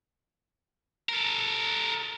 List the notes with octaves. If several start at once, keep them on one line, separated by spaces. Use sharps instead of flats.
A4 A#4